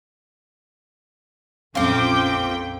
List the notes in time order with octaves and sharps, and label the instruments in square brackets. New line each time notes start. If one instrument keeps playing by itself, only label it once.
[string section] A#1 F2 G5 [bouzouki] C4 F4 [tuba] C#4 [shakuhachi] D6